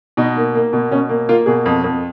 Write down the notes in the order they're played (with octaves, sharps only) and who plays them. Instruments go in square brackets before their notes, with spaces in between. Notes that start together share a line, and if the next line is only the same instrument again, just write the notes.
[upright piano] B2 D#4
A#3
A#3
B2
B2 C#4
A#3
A#3 F4
B2 G#4
F2
F2